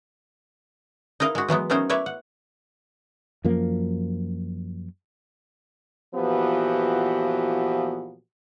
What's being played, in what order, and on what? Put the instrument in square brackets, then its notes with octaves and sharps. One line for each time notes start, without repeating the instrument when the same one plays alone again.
[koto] D#4 E4 A#4 D#5 F5
G#3 F#4
E3 F#3 G#3 B3
A3 B3 C#4 D#4 A#4 C5
E4 B4 C#5 D5 E5
F#5
[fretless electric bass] F#2 F3 A#3
[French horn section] A#2 E3 F3 B3 F#4 G4